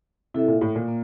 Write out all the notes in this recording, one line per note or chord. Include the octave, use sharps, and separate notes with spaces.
C3 E4 A4 E5
A#2
A2
A#2
A#3